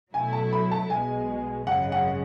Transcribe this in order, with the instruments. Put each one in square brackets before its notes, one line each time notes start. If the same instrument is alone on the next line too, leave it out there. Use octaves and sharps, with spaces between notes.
[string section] B2 F#3 A3 E4 [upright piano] G#5
[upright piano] A5
B5
A5
[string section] B1 B2 G#3 [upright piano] G#5
[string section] G#1 F#2 C#3 G#3 [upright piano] F#5
[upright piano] F#5